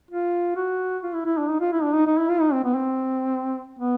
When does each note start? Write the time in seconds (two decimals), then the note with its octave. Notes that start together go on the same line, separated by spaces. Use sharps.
0.11 F4
0.56 F#4
1.03 F4
1.14 E4
1.26 E4
1.38 D4
1.49 D#4
1.60 F4
1.72 E4
1.83 D4
1.94 D#4
2.06 D#4
2.18 E4
2.30 F4
2.41 D#4
2.52 C4
2.64 B3
2.75 C4
3.79 B3